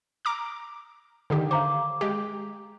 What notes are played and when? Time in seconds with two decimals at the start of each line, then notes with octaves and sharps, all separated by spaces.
0.25 A#5 D6 F6
1.30 D3 D#3 G4
1.51 C5 F5 A#5 D6
2.01 G#3 G4